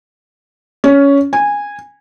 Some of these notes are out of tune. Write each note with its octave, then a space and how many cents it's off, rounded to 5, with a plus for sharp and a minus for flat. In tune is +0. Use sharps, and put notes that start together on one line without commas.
C#4 +15
G#5 -15